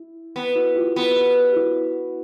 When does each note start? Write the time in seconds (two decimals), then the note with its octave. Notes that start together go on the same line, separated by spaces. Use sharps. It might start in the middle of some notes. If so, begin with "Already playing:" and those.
Already playing: E4
0.36 B3
0.55 E4 F#4
0.76 F4 G4
0.96 B3
1.52 G4
1.56 E4 F#4